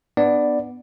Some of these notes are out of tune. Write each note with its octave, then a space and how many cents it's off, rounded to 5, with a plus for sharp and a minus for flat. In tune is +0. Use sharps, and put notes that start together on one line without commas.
B3 +0 D4 +25 D5 +0